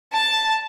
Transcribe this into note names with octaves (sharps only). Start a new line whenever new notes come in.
A5